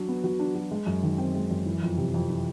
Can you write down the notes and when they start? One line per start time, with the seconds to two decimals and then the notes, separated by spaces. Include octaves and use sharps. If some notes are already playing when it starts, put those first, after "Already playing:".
Already playing: F#3 D4
0.08 B3
0.24 F#3
0.39 D4
0.55 F#3
0.71 G#3
0.86 F#2
1.03 D#3
1.18 C4
1.35 G#3
1.50 F#2
1.66 E3
1.82 F2
1.97 C3
2.14 F2
2.30 E3